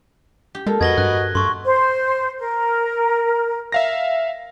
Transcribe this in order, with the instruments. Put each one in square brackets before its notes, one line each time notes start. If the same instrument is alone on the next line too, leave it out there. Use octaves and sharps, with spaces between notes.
[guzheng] G4
[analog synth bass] G#3 [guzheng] A#3 A4 F5
[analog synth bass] F2 [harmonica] F#4 B4 D#5 [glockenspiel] G#6 A#6 G7
[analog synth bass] G2 [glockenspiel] F#6
[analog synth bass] G2 [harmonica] A3 [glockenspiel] C6 C#6
[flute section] C5
A#4
[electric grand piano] E5 F5 A#6